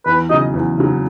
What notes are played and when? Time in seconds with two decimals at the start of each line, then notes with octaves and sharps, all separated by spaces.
0.06 E2 B4
0.30 C#3 F#3 D#5
0.54 E2
0.78 C#3 F#3